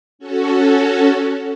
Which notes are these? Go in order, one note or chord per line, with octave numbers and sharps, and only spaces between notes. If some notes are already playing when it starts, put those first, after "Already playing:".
C#4 F#4 A4